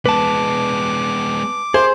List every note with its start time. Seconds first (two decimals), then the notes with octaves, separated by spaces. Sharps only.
0.06 G#3 B3 B4 A5 D6
1.74 G#4 C5